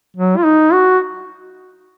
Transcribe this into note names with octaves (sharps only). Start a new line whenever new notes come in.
F#3
F4
D#4
F#4